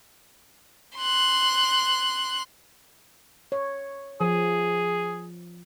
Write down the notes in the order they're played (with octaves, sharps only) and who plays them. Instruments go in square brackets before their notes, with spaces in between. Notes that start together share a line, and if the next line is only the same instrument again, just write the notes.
[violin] C6 F#6
[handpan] C#5
[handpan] F3 [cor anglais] G#4